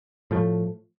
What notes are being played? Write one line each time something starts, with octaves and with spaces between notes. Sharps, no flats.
A2 F3 A3